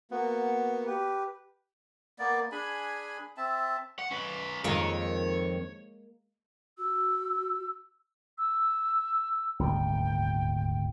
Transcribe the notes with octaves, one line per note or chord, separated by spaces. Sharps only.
A#3 B3 F#4
G4 B4
A#3 B3 D5
D4 G#4 G#5 B5
C4 E5 A5
F#5
C#4 B4
F2 D#3 G#3 A#3 C#5
F#4 E6
E6
D#1 G#1 D2 G5